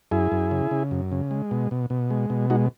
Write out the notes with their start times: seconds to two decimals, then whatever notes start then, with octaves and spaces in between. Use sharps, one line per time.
0.11 F#2 E4 G#4
0.32 F#2
0.51 C#3
0.71 C#3
0.91 F#2
1.12 C#3
1.31 G#3
1.51 B2
1.71 B2
1.90 B2
2.11 G#3
2.30 B2
2.50 G#3 D#4 F#4